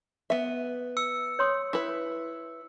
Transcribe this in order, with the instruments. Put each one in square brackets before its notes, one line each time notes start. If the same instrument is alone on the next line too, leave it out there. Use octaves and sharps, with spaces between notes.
[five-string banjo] B3 E5
[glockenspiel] E6 C#7
[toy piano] C#5 C6 D#6
[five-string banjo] E4 B4